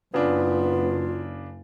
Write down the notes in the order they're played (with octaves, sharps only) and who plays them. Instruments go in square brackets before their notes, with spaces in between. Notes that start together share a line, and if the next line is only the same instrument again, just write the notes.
[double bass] F#1 [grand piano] C#3 D4 [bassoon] B3 [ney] F4